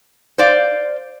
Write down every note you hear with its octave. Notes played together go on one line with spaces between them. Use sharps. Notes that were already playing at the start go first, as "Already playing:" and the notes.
C5 D5 F5